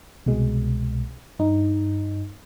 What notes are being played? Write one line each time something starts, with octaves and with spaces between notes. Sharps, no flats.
C2 B2 G#3
G2 D#4